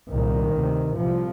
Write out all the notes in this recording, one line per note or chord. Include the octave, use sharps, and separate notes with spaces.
C2 A#2 D#3
D2 C3
C2 C3 F3